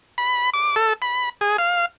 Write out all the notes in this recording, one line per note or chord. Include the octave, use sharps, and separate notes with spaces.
B5
D6
A4
B5
G#4
F5